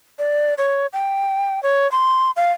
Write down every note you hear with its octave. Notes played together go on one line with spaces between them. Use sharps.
D5
C#5
G5
C#5
C6
F5